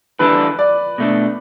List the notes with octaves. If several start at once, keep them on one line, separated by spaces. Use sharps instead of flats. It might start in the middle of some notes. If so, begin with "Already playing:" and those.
E3 G3 D4 A4 B4
D5
B2 A3 D4